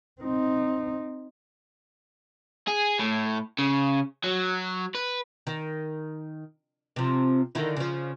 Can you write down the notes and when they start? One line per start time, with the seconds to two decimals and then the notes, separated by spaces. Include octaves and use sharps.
0.21 C4 D#4
2.67 G#4
2.99 A2
3.59 C#3
4.24 F#3
4.95 B4
5.47 D#3
6.96 C3 F3
7.55 D3 D#3 E4
7.77 C#3 F3